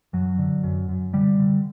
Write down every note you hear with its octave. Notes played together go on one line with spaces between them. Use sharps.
F#2 F#3
D3
F#2
F#2
D3 G3
D3